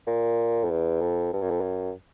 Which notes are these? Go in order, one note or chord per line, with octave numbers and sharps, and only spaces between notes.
A#2
F2
E2
F2
G2
F#2
F2
F#2